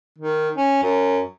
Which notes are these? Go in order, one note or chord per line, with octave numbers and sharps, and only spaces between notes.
D#3
C#4
F#2